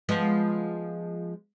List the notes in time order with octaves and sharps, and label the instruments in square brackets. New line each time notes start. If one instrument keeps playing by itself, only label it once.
[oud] F3 G#3 B3